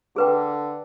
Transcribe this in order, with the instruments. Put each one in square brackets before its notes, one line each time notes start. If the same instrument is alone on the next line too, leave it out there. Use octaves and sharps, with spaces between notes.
[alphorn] D3 [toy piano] G#4 B4 G5